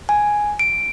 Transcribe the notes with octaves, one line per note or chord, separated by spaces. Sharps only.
G#5
D7